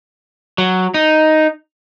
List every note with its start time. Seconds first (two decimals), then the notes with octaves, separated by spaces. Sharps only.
0.58 F#3
0.94 D#4